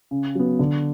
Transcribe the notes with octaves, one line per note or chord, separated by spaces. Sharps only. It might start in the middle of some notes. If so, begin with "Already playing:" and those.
C#3
F#3 B3
D3